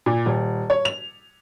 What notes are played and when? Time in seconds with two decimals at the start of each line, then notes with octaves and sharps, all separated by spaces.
0.06 A#2
0.26 D#1
0.70 C#5
0.85 F7